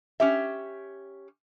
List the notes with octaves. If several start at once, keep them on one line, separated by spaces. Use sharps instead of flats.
C#4 G4 E5